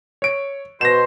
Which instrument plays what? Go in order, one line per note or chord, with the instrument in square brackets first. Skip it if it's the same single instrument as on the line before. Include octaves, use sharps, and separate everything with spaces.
[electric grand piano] C#5 D7
[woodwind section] B2 C5 [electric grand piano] A#6 E7